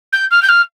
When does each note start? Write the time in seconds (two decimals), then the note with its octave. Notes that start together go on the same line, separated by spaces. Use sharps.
0.12 G6
0.31 F6
0.42 G6
0.48 F6